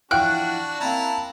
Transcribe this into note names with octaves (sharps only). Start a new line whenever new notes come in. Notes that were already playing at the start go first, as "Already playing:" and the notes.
E3 F3 D4 F#4 F#5 G5 F6 F#6
A#3 C4 C#4 E4 A5 A#5